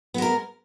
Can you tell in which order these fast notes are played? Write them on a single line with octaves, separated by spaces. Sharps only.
B3 G#3 A#4